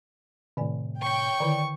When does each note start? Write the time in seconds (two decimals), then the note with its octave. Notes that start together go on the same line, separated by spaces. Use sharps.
0.57 A2 C3 D#3 D5 G#5
1.02 C#5 G5 C#6
1.40 D3 D#3 E4 D5